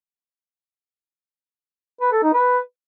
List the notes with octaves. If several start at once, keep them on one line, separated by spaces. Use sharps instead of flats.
B4
A4
D#4
B4